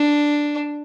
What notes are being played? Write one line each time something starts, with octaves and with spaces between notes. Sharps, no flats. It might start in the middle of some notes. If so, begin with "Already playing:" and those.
Already playing: D4